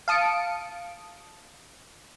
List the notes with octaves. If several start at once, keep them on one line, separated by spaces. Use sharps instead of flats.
F5 A5 D#6 C#7 D7